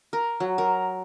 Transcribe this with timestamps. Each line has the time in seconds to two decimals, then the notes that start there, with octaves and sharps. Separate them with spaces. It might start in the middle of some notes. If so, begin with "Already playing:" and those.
0.13 A#4
0.40 F#3
0.58 A#4